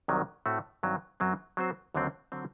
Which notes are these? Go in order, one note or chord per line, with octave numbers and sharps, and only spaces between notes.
C2 C3 D#3 F#3
A2 A3 C4 F#4
G2 D#3 F#3 C4
F#2 F#3 C4
F#3 C4 F#4 C5
D#2 D3 F#3 C4
D3 F#3 C4